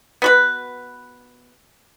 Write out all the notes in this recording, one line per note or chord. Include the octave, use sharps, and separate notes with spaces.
B3 F#4 B4